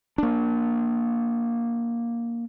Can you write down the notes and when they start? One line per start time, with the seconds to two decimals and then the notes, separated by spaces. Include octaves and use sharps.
0.18 A#3 D4